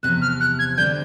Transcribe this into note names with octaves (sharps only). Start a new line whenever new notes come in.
E2 C3 F3 F#6
F6
F#6
G#6
D3 G3 C4 G6